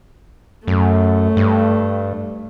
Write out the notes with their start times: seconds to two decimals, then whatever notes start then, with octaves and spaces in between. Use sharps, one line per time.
0.67 F#2 A3
1.37 G2